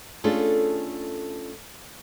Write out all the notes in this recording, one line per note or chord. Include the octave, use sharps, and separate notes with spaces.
A3 C#4 D4 F4 G#4 A4